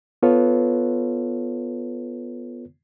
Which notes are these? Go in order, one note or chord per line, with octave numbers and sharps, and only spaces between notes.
B3 F4 A4 B4 C#5